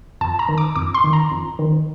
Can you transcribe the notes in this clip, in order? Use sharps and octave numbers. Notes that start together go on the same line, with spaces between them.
F2 A5
A#5
D#3
D6
F2 D6
C6
D#3
A#5
F2
D#3